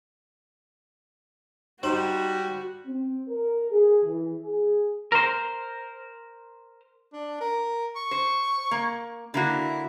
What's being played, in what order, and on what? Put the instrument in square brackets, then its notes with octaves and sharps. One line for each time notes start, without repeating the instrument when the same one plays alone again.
[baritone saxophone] G3 [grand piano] D#4 F#7 [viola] F#4 [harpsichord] C5
[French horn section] C4
A#4
G#4
E3
G#4
[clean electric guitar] A#4 C5
[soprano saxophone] D4
A#4
C#6
[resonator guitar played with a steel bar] C5
A#3
[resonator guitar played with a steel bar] D3 A#3 F#4 [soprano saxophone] E4